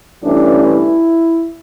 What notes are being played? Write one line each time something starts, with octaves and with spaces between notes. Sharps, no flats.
G2 E3 A3 C#4 D4
E4